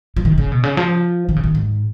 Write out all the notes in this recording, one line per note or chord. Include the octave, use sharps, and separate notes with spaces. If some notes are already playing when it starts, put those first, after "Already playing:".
F3
D#3
C#3
B2
C#3
F3
D#3
C#3
D#3
G#2